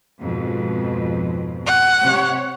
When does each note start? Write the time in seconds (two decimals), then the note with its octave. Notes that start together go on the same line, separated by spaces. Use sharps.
0.20 F2 G#2 B2
1.66 F#5
2.02 C3 C#5